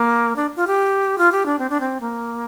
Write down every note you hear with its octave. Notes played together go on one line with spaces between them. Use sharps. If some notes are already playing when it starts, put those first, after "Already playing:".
Already playing: A#3
D4
F4
G4
F4
G4
D4
C4
D4
C4
A#3